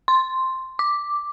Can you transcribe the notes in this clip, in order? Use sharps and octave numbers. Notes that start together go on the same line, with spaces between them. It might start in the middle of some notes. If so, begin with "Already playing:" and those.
C6
D6